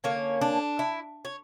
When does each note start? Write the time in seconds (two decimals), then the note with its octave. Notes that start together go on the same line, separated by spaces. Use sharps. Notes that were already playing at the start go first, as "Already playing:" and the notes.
0.04 D3 A#3 C#4 C#5
0.41 D4
0.79 E4
1.25 C#5